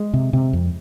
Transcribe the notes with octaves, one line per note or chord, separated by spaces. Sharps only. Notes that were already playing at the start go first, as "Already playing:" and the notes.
Already playing: G#3
C3
C3
F2